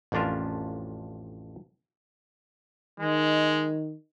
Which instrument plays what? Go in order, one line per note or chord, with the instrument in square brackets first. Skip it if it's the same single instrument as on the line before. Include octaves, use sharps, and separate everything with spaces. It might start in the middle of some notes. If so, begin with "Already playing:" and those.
[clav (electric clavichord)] A1 F2 C#4 D4 F4 A#4
[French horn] D#3 [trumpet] G#3